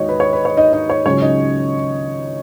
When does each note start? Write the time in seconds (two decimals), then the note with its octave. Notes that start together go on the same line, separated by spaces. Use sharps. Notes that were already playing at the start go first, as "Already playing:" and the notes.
Already playing: D#2 D#3 G#3 D#4 F#4 C#5
0.09 B4
0.20 C#5
0.33 B4
0.45 C#5
0.57 D#4 D#5
0.73 D#4 D#5
0.90 C#5
1.06 C#2 C#3 F#3 C#4 C#5
1.21 D#4 D#5